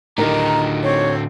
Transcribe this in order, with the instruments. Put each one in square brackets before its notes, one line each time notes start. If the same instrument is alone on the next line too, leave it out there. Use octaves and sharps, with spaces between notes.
[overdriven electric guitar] A2 D3 [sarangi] D#3 [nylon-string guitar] D#4 G4 A#4 [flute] A#5
[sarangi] C4 [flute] C#5